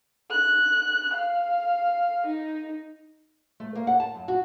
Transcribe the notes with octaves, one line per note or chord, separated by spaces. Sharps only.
F#6
F5
D#4
A3
A#3
F#5
A5
F#2
F#4